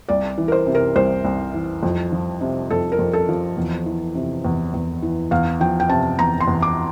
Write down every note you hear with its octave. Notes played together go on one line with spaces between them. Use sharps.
C2 D5
E3
A#4
C5
C3
A#4
C2 C5
C2
E3
F2
F3
C3
F2 A4
A#4
F2
A4
F3
E2
E3
C3
E2
E2
E3
E2 F5
F3 G5
G5
C3 A5
E2 A#5
C6
E2
D6